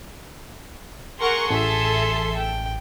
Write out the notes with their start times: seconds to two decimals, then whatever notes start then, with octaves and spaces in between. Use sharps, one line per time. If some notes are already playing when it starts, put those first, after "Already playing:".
1.20 G#4 A#4 F#5 C6 C#6
1.50 A1 A4 E5
2.37 G5